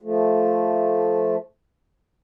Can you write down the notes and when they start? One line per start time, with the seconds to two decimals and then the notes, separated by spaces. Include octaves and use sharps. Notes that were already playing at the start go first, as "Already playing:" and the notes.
0.02 F3 A3